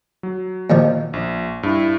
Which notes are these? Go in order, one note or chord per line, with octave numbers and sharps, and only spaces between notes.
F#3
A#2 D#3 F3
A#1
G2 E4